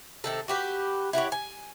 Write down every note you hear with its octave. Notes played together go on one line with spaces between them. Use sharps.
C3 D#3 A4
F#4 G4 B4
E4 F#4 G4 C#5
G#5